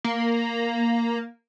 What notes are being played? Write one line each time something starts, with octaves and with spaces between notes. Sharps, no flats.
A#3